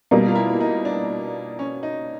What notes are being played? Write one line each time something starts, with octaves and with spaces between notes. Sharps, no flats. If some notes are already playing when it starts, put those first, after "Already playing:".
B2 G3 A#3 D#4
F4
E4
D#4
D4
C#4
D#4